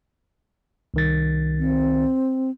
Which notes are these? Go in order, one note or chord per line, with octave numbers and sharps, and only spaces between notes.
C2 D#3 A6
C4